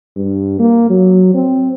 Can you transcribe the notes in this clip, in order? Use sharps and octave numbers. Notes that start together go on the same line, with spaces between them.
G2
A#3
F#3
C4